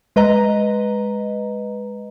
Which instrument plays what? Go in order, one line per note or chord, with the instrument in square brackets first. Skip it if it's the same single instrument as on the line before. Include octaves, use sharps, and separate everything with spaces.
[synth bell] G#3 B4 D#5 A#5